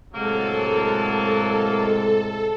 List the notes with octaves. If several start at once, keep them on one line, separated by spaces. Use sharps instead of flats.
A2 C3 F#3 G#3 A#3 A4